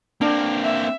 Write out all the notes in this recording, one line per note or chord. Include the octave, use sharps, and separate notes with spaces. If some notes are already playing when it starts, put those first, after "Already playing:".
A#3 C4 D4
E5